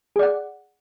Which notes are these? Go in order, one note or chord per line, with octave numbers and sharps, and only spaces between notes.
G#4 D5 F#5